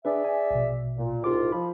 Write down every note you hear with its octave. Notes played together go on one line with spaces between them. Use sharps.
D4 G#4 B4 D5 E5
G#5
A#1 B2
A#2
C2 G#2 F4 D6
F3 B5